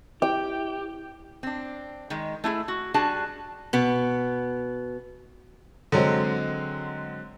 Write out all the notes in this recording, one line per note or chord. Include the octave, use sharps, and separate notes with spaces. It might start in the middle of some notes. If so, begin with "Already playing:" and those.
E4 G4 G5
C4 D4
D#3 G#3
A3 E4 F4 G#4
F#4
G3 D4 F#4 G#4 A5
B2 B3
D3 F#3 G#3 C4